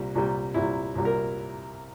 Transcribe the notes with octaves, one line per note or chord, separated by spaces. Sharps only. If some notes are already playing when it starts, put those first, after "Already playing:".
Already playing: C2 A#2 G3
C2 A#2 G3
C2 A#2 G3 E4
C2 A#2 G3
A#4